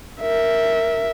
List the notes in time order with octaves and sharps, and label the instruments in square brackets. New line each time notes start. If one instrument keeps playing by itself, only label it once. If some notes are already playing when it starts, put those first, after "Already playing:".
[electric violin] A#4 E5